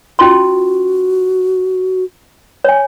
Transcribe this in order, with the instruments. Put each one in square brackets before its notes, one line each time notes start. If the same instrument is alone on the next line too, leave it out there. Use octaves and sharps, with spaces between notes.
[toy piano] C#4 F4 C6 [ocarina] F#4
[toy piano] C#5 G#5